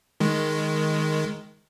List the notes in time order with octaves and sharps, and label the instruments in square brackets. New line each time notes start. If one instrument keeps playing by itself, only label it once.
[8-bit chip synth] D#3 G#3